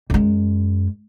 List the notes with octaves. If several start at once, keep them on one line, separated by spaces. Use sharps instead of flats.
F#2 G#3